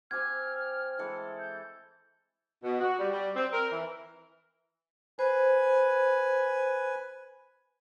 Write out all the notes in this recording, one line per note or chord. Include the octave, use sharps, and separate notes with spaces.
C4 G4 G#5 F6 G#6
E3 G#3 A4
G6
B2
F#4
G3
G3
C4
A#4
E3
B4 C5 G#5